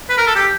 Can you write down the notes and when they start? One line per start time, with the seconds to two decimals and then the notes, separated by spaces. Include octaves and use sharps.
0.09 B4
0.18 A#4
0.27 A4
0.36 G4